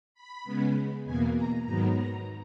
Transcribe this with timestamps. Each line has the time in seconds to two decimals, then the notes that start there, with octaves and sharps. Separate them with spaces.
0.14 B5
0.44 C#3 G#3 B3
1.05 E2 B2 A#3 G#5
1.35 A#5
1.65 G#2 D#3 F#3 B3 A#5
1.96 A#5